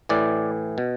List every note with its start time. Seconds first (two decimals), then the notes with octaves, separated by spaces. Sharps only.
0.09 A2 E3 D5
0.78 B2